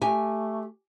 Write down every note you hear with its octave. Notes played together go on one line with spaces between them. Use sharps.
A3 G4 G#5